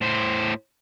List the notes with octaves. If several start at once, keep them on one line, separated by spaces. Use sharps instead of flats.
A2 C5